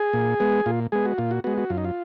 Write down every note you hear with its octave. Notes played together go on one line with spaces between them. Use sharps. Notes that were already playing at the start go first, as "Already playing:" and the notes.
Already playing: G#4
A#2
G#3 B3
A#2 F4
G#3 B3 G#4
F#4
A#2 F4
F#4
G#3 B3 F#4
F#4
F#2 F4
D#4
F4